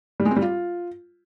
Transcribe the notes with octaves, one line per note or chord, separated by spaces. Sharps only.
G3
G#3
C4
G3
F4